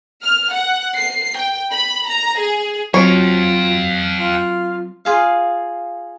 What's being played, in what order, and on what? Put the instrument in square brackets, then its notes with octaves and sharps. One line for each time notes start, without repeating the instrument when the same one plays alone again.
[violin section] F6
F#5
C7
G5
B5
A#5
G#4
[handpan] F#3 C4 [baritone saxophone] F4 [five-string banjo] C#5 [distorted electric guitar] F5 G5
[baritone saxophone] F4
[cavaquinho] F4 G#4 F5